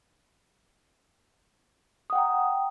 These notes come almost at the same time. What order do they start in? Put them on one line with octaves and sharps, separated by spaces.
D#6 F#5 G5 A#5